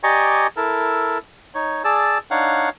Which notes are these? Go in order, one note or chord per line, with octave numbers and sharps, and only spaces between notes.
G4 D5 D#5 G#5 A#5 C#6
E4 A4 A#4
D#4 C#5
G#4 D5 A5 E6
D4 D#4 C#5 F5 F#5